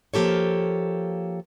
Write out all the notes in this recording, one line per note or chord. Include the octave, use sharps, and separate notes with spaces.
F3 A#3 G4 A4 C#5